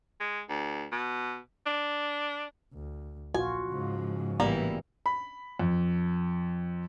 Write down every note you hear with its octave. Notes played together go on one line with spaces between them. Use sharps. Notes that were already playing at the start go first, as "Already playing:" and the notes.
G#3
D2
B2
D4
D2
A#1 F4 F#4 G#5
G#2 C#3 F3
A1 E3 G3 A#3 B3
B5
F2